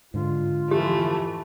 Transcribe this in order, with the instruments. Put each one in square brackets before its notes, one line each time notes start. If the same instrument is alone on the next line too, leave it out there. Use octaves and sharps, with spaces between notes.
[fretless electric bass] G#2 D3 [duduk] F4
[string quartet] F2 E3 A3 [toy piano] G4